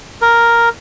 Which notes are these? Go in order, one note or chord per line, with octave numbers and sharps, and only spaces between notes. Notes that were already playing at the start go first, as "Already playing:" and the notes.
A#4